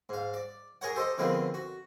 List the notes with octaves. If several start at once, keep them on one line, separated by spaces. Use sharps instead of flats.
G#2 F5
D5
G#4 A#4 C#5 F#5
G4 A4 C5 D#5
D3 D#3 F3 G#3 B3 C4
F#4